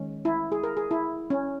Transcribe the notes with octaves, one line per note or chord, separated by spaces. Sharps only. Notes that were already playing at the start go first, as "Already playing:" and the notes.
Already playing: D#3 G#3 C#4
E4
G#4
A#4
G#4
E4
C#4